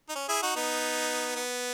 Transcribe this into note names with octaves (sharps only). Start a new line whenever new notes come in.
D#4
C#4
E4 G#4
D#4 F#4
B3 D#4
B3